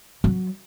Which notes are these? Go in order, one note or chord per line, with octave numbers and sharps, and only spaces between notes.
F#3